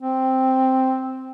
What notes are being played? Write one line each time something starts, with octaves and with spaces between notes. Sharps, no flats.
C4